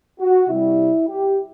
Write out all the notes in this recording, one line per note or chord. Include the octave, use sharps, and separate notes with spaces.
F#4
C3 G3 E4
G4